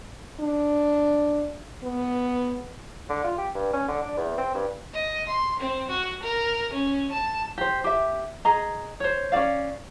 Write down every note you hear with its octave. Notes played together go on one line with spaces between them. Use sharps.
D4
B3
D3
F4
G4
G2
C#4
D3
D4
E2
C4
G2
D#5
C6
C4
F#4
A#4
C#4
A5
G4 C5
G4 E5
G#4 D#5 A#5
C5 C#5
C#4 D#4 D5 F5